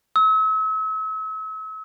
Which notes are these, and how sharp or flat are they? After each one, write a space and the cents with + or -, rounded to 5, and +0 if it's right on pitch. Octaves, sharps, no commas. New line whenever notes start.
E6 -40